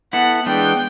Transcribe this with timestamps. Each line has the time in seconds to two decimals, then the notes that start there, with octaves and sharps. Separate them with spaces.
0.13 B3 E4 A4 F#5
0.46 E3 G#3 B3 D4 G5